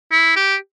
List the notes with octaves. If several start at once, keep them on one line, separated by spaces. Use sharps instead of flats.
E4
G4